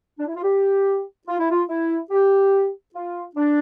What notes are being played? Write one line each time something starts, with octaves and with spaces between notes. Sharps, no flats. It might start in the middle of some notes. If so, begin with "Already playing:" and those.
D4
E4
F4
G4
F4
E4
F4
E4
G4
F4
D4